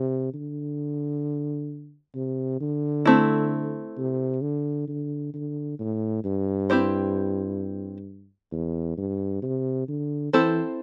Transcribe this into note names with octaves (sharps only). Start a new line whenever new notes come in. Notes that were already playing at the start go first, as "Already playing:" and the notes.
Already playing: C3
D3
C3
D3
A3 C4 E4
C3
D3
D3
D3
A2
G2
C4 E4 G4 C5
E2
G2
C3
D3
E3 C4 E4 A4 C5